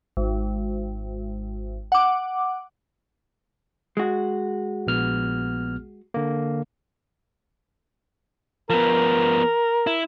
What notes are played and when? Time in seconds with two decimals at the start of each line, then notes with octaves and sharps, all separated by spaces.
0.17 G#1
1.92 F#5 D6
3.97 G#3 F#4
4.87 A#1 B3 F6
6.14 D3 A#3
8.70 F3 B3 A#4
9.87 E4